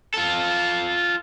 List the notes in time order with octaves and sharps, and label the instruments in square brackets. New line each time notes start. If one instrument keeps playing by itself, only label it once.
[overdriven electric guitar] F4 A4